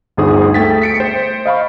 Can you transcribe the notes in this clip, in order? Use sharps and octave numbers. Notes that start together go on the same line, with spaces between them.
G1 D2 D#4 G#4 C5 D#6
A3 G5 A6 B6
B6 C#7 D7
C5
D#5 F5 B5 C#6